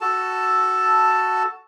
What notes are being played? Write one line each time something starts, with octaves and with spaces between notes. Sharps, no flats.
F#4 A4 A5